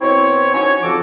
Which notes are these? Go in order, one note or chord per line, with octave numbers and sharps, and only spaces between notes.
B2 C4 E4 C#5
F#3 C#4 D#4 C#5
F2 C#3 F3 F#4 A4 D6